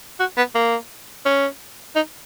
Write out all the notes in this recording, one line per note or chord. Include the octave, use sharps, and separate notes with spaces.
F#4
B3
A#3
C#4
D#4